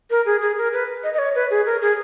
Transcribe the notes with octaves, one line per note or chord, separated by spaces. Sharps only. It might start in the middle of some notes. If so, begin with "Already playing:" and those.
A#4
G#4
G#4
A#4
B4
D#5
D#5
C#5
B4
G#4
A#4
G#4